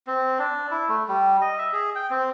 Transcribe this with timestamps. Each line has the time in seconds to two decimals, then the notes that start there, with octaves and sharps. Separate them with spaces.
0.07 C4
0.39 D4
0.71 E4
0.89 A3
1.08 G3
1.42 D#5
1.58 E5
1.73 G#4
1.95 G5
2.10 C4